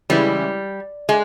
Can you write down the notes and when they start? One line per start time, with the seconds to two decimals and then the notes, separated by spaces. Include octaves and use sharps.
0.10 C#3 E3 G3 G#3 E4
1.09 G#3